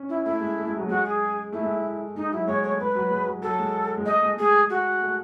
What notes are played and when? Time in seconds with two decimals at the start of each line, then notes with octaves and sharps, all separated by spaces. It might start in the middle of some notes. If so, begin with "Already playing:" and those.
Already playing: C#4
0.09 E4
0.24 A3 E4
0.41 G#3
0.57 A3
0.67 G#3
0.77 F#3
0.88 G#3 F#4
1.04 G#4
1.52 A3 E4
1.63 G#3
1.73 A3
2.16 G#3 D#4
2.31 F#3 E4
2.47 G#3 C#5
2.62 A3 C#5
2.79 G#3 B4
2.95 F#3
3.11 G#3
3.26 F#3
3.42 F#3 A4
3.59 G#3
3.97 G#3
4.05 A3 D#5
4.22 G#3
4.37 G#3 G#4
4.69 F#4
5.01 A3